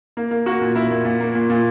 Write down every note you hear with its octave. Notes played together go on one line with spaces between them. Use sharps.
A#3
A#3
A#3 F#4
A#2
A#3 E4
A#2
A#2
A#3
A#2
A#2